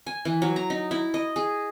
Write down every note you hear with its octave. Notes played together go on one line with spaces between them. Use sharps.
G#5
E3
F#3
A#5
D#4
E4
D#5
G#4